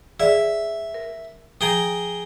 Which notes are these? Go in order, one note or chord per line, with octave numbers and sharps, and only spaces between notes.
G#4 D5 E5 F5
A#4
F3 G#4 G5 A#5